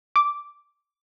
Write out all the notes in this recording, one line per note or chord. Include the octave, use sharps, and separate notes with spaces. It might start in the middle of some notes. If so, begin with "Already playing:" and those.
D6